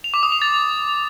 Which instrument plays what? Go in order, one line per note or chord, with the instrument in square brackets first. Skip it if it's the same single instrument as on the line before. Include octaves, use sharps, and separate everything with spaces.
[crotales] F7
D6
D#6
F7
A6